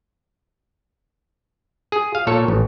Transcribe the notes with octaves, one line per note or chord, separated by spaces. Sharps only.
G#4
F5
A#2 A4 C#5
A1